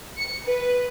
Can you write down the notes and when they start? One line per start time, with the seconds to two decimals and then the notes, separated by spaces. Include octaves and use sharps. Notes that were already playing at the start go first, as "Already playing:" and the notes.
0.17 C#7
0.45 B4